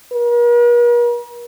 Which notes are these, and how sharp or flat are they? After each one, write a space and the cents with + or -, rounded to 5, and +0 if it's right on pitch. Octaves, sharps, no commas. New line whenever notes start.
A#4 +45